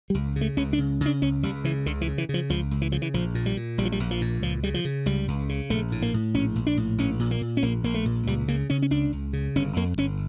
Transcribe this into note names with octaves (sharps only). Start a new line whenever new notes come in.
G3
C#2
C#3
A3
C#2 C#4
D4
C#3
C#3
D4
C#2 C#4
C#2 G3
C#3 E3
C#2 D3
E3
C#3
E3
C#3 F3
C#2 F3
C#2
E3
C#3 F3
E3
A#1 F3
A#2
G3
A#2
A#1 G3
F3
G3
A#1
F3
A#2
C#2 F3
C#3 G3
F3
C#3
C#2 G3
C#2
C#3
A#1 A3
A2
A#3
A2
A#1 C#4
A#1
D4
A2
A#1 C#4
A#2
A#3
A#2
C#4
A#1 A#3
A#1 A#3
A3
A#2
C#2 G3
C#3 A#3
C#3 C#4
C#4
C#2 D4
C#2
C#3
G1 C#4
F2 A#3
G1 C#4